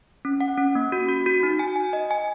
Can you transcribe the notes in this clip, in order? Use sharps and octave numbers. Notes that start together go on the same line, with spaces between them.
C#4
F#5
C#4
A#3
F#4
F#4
F#4
D#4
G#5
G#5
D#5
G#5